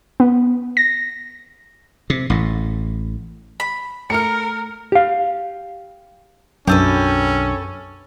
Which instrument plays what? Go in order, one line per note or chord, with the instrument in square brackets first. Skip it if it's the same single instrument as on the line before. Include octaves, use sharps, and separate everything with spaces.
[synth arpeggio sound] B3
A#6
[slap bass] C3
A1 A2
[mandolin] B5
[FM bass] A3 [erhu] A#4 [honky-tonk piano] F6 C#7
[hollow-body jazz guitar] G4 F5
[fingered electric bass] B1 D4 [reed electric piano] F#2 [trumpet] C#4 [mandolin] G4 A4 B4